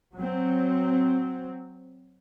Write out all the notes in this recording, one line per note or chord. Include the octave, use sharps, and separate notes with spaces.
F#3 C4